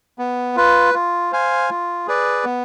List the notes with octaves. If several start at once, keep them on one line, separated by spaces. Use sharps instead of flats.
B3
F4 B4
F4
C5 F5 G#5
F4
G#4 B4 D5
B3